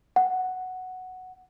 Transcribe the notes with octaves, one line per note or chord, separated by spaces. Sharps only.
F#5